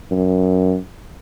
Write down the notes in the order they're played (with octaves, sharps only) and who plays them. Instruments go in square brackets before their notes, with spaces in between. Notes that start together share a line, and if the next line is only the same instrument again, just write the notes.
[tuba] F#2